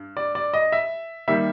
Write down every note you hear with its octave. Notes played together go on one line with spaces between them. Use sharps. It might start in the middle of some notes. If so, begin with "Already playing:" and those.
Already playing: G2
D5
D5
D#5
E5
D#3 G3 A#3 E5